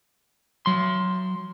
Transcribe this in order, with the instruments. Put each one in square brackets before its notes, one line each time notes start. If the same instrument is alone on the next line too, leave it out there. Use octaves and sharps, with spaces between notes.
[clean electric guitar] F#3 C6